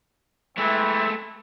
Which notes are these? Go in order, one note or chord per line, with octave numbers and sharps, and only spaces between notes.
E3 G#3 A3 C4